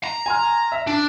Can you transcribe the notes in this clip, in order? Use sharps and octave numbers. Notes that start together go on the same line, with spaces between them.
A#5
G#5 C6 F6
E5
D4